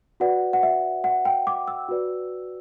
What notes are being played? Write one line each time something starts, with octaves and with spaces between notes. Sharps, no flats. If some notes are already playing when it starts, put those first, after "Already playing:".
F#4 B4 D5 F#5
F#5
E5
F#5
G5
D6
E6
F#4 B4 D5